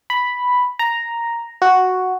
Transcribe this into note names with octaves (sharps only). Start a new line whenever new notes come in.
B5
A#5
F#4